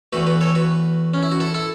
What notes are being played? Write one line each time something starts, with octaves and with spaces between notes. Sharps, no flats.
E2 E3 A3 F#4 B4
F#4 B4
A4 C#5
F#4 B4
C#4
E4
F#4
E4 A4
E4 A4